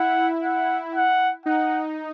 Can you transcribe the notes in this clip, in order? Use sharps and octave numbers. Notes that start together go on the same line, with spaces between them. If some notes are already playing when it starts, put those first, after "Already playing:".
Already playing: E4 F#5
F#5
F#5
D#4 F#5